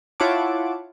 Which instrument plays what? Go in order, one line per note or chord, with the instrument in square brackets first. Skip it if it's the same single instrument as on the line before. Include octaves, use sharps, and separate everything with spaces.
[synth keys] E4 F4 C#5 F#5 A5 D6